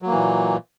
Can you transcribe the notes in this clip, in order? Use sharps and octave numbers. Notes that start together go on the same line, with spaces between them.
A#2 E3 F#3 A#3